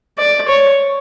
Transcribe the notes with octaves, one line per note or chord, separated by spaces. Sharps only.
D5
C#5